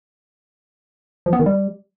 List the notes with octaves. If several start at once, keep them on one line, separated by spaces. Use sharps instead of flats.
F3
B3
D#3
G3